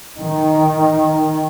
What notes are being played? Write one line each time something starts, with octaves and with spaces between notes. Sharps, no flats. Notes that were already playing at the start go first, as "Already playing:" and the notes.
D#3